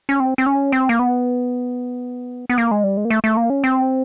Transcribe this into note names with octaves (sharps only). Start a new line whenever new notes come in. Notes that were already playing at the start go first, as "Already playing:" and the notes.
C#4
C4
C4
C#4
C4
A#3
B3
B3
A#3
G#3
G3
G#3
A#3
A3
A3
A#3
C#4
C4